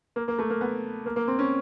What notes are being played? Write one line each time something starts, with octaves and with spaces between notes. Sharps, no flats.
A#3
A#3
A3
A#3
B3
A#3
A#3
C4
C#4